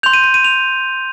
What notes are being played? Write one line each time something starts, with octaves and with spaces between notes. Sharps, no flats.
C6 G6 F7
D#7
D#7
D#7
F7